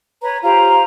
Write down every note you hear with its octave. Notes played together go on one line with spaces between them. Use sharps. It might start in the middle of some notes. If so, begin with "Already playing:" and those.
B4 C#5 A#5
F4 G4 C5 A#5